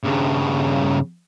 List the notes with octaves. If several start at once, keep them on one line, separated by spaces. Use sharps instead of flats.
G2 C#3